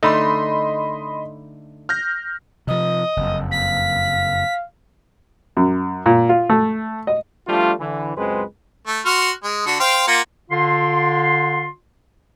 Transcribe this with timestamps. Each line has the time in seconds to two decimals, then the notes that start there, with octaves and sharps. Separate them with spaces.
0.03 D3 A3 D#4 D#5 B5 C6
1.89 F6 G6 A#6
2.67 C3 F3 D#5
3.17 F#1 F2
3.51 F5 B6
5.57 F#2
6.06 A#2
6.29 F4
6.50 A3
7.07 D#5
7.48 F3 G3 A3 D4 F4
7.80 D3 E3
8.16 C#2 F#2 G#3 C4 B4 C5
8.87 A3
9.06 F#4 C6 F6
9.44 G#3
9.66 D3 F#4
9.80 C5 F5 G5
10.07 A#3 F4 F#5
10.51 D3 F4 C6